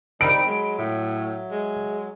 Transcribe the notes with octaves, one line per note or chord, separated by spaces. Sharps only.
G3 C4 D#4 B5 D7
F#3 G#3
A2 E5
G#3